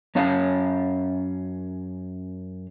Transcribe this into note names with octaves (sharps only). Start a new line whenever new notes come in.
F#2 C#4 C#5 F5